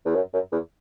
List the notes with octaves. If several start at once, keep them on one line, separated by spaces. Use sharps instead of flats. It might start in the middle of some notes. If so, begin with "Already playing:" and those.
E2
F#2
F#2
E2